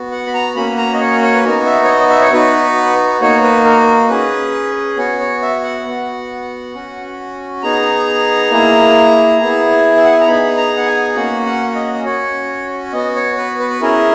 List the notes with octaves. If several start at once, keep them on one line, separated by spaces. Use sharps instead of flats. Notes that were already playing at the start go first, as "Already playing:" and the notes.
Already playing: B3 F#4
F#5
B5
A#5
A#3 C#4 F#4 B5
A#5
D#5
C#5
C#5
B4
B3 D#4 F#4 A#4
E5
C#5
D#5
E5
C#5
B3 D#4 F#4 B4
A#3 D#4 F#4 C#5
B4
A#4
C#4 G#4 B4
B3 F#4 C#5
C#5
E5
F#5
B3 F#4
C#4 F#4
B3 D#4 G#4 A#5
A#3 E4 G#4
B3 E4 G#4
E5
F#5
G#5
A#5
B3 D#4 G#4 B5
A#5
F#5
G#5
A#3 C#4 F#4 F#5
F#5
D#5
D#5
C#4 F#4 C#5
B3 F#4 D#5
C#5
B4
B4
B4
C#4 E4 G#4 A#4